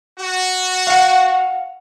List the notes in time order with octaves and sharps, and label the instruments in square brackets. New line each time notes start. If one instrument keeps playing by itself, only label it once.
[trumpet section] F#4
[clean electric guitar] F5 F#5